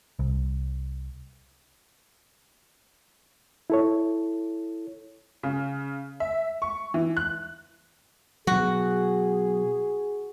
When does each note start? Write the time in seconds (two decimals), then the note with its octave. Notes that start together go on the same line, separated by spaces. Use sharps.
0.19 C2
3.70 E4 A4 C#5
5.43 C#3
6.20 E5
6.62 C#6
6.94 E3
7.17 F#6
8.47 B2 F#3 F#4 G#4